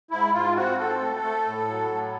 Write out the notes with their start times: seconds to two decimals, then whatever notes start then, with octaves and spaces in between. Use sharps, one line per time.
0.11 G#2 E4
0.33 G#2 F4
0.56 C4 F#4
0.78 C4 A4
1.01 A3
1.23 A3
1.46 A2
1.68 F#3
1.90 A2